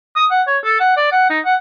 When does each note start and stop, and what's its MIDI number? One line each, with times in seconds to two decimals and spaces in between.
0.16 0.25 87
0.31 0.42 78
0.47 0.58 73
0.64 0.76 69
0.80 0.96 78
0.97 1.09 74
1.12 1.28 78
1.30 1.39 63
1.45 1.55 78